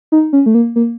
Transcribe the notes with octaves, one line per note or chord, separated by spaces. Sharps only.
D#4
C#4
A3
A#3
A#3